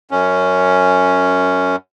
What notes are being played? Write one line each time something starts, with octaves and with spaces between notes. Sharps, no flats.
F#2 C#4